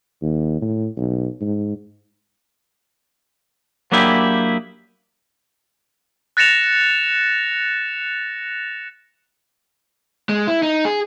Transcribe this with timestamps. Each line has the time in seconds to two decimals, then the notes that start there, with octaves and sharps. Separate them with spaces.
0.22 D#2
0.61 A2
0.97 B1
1.41 G#2
3.92 F#3 A#3 D4 E4 G4 G#4
6.37 F#6 A6 A#6 C#7 E7 F7
10.29 G#3
10.48 E4
10.63 D#4
10.85 G#4